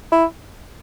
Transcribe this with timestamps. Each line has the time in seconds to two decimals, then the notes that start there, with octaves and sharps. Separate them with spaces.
0.12 E4